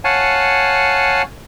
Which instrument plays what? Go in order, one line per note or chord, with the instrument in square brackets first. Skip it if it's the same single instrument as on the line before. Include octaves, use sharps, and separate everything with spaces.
[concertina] C#5 F5 F#5 G#5 A5